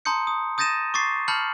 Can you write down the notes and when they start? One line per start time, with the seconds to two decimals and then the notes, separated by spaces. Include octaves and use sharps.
0.05 A5 A#5 C6 D#6 G6 C#7
0.27 D#6
0.58 D#6 G6 A6 A#6 D#7 E7
0.94 C#6 D6 A6 C7
1.28 A5 B5 F6 G6 C#7 F#7